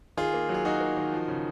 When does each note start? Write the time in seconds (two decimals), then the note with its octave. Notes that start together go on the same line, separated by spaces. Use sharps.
0.17 D#3 F4 G#4
0.34 A#3
0.49 F#3
0.54 G#4
0.65 F#3 D#4 F#4
0.80 A#3
0.97 D#3
1.12 F3
1.28 C#3